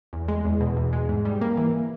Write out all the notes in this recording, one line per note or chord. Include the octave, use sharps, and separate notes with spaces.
E2
G#3
E2
B2
E2
G#3
G#2
G3
A#3
E3